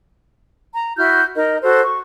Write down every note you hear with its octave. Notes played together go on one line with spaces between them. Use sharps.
A#5
E4 F#4 F6 G6
D#4 A#4 D#5
F#4 A4 C5
C#6